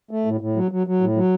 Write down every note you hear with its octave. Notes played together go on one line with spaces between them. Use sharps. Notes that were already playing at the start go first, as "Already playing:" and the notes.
A3
A2
A2
F#3
F#3
F#3
A2
F#3